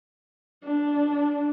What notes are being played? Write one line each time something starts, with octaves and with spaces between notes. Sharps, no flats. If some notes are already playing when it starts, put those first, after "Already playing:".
D4